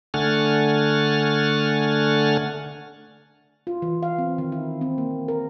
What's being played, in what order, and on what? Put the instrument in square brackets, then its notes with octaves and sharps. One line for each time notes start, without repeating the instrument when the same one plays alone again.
[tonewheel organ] D3 A3 F#5 G#5 F6 A6
[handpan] F4
E3
F5
C4
D#3
E4
C4
A#3
A#4